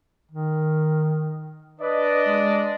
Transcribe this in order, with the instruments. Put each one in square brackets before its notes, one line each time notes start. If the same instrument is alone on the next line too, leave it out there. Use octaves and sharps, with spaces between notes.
[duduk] D#3
[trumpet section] D4 D5 D#5 [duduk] B4
[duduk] G#3